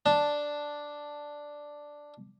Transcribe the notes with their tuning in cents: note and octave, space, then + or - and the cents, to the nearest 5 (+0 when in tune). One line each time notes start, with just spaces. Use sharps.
D4 +0 A5 +0